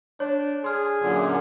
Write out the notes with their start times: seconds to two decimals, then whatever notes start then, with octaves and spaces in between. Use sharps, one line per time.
0.20 D4 C#5
0.64 G#4 C6 F6
1.01 F#2 A#2 D3